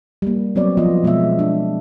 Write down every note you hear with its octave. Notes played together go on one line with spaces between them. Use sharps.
G3 A#3
F#3 B3 C4 C#5 D5
F3 B3 F4 D#5
B2 G#3 B3 D#5 E5
D4